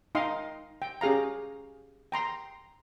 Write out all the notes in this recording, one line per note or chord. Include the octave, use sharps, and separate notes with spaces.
D#4 D#5 F5 G5 C6
G5
C#4 G4 G#4 F5 A#5
G5 A#5 C6